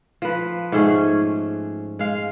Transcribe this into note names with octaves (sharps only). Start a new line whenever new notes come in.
F3 B4
G#2 A3 C#4 G#4
G#3 F5